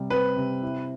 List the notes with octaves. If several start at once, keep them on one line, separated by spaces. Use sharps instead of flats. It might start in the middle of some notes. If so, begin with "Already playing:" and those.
Already playing: C3 G3
C4 B4
C3
E4